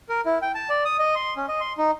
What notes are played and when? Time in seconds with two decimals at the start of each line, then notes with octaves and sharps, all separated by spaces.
0.09 A#4
0.26 E4
0.42 G5
0.55 A5
0.70 D5
0.85 D#6
0.99 D#5
1.15 C6
1.37 C#4
1.48 D#5
1.61 C6
1.78 D#4